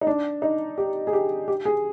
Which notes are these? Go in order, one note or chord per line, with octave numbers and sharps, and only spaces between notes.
D#4
D4
D#4
G4
G#4
G4
G4
G#4